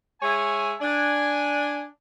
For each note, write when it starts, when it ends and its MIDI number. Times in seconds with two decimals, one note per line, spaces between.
0.21 0.73 56
0.21 0.73 73
0.21 0.73 76
0.21 0.73 80
0.81 1.86 62
0.81 1.86 80